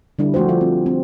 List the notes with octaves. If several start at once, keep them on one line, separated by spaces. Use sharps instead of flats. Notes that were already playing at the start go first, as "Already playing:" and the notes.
D3 G3 D4 E4
F3 A3 F#4 G4 C5
F3 F4
C4
C4